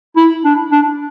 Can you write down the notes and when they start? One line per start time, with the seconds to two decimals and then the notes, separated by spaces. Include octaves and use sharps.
0.16 E4
0.44 D4
0.71 D4